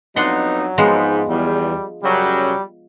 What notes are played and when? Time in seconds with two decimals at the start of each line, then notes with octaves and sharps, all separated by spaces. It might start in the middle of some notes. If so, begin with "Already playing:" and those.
0.16 F2 F#3 B3 D4 D#4 F#5 C6
0.78 G#2 F3 G#3 B3
1.29 E2 G3
2.03 F#2 C#3 F#3 G3